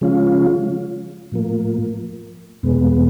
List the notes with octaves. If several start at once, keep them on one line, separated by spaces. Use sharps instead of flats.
C#3 F3 G#3 C#4 F4
A2 F3 A#3
E2 B2 G#3 B3